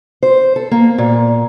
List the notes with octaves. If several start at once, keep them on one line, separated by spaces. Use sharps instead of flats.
C5
A4
A#3
A#2